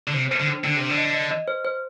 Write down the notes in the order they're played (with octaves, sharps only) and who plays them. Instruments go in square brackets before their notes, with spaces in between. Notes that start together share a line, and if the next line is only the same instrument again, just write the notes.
[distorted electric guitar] D3
[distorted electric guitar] C3 [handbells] C5
[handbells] C5
[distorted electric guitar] D3
[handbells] D4
[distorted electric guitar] D3 [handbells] D4
[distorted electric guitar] C3 [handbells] C5
[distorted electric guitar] D3
[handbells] D#5
D#5
D#5
C5
C5